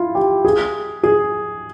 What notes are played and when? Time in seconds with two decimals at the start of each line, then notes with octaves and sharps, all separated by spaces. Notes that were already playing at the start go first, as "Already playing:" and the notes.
Already playing: E4 F4
0.15 G4
0.45 G#4
1.04 G#4